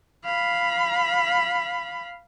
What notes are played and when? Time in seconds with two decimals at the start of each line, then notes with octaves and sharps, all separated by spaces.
0.25 F5 B5